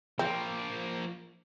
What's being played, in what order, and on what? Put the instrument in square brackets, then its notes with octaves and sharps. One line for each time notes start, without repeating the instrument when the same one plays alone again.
[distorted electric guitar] F3 A#3 [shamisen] C4